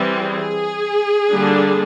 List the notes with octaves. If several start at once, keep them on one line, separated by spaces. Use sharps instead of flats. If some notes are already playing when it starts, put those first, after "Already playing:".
Already playing: E3 G3 C4
G#4
D3 G3 A#3 D4